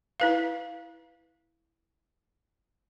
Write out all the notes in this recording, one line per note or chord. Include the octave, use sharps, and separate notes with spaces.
E4 B4 F5